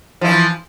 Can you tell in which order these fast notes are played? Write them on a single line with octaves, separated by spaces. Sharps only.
F3 E4 E3